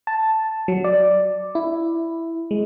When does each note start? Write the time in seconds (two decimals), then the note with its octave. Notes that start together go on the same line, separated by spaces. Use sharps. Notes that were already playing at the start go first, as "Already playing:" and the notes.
0.07 A5
0.68 F#3
0.84 D5
1.55 E4
2.51 G#3